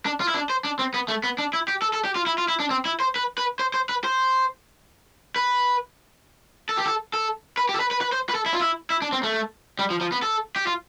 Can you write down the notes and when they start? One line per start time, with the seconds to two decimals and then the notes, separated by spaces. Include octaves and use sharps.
0.06 D4
0.20 F4
0.28 E4
0.34 D4
0.50 C5
0.64 D4
0.79 C4
0.94 B3
1.08 A3
1.24 B3
1.38 D4
1.53 E4
1.68 G4
1.82 A4
1.93 A4
2.05 G4
2.15 F4
2.26 E4
2.38 F4
2.48 E4
2.60 D4
2.71 C4
2.85 E4
3.00 C5
3.16 B4
3.38 B4
3.59 C5
3.74 C5
3.89 B4
4.04 C5
5.36 B4
6.69 A4
6.78 G4
6.86 A4
7.14 A4
7.58 B4
7.69 G4
7.74 A4
7.80 B4
7.91 B4
8.01 B4
8.12 C5
8.29 B4
8.35 A4
8.46 E4
8.54 F4
8.61 E4
8.90 E4
9.02 D4
9.13 C4
9.23 A3
9.79 G3
9.90 F3
10.01 F3
10.12 B3
10.23 A4
10.56 G4
10.67 F4